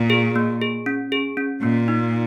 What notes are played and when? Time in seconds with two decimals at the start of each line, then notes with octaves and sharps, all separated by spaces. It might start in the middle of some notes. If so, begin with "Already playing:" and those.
Already playing: A#2
0.10 G#4
0.36 A#3
0.62 G#4
0.86 C#4
1.12 G#4
1.37 C#4
1.62 A#2 A#3
1.88 D#4